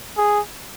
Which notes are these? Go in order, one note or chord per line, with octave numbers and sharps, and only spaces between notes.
G#4